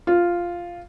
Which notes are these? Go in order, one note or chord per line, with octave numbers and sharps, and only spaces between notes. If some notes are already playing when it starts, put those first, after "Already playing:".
F4